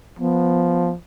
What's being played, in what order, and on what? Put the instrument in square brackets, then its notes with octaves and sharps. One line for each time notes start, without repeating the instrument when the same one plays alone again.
[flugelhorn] F3 [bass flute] B3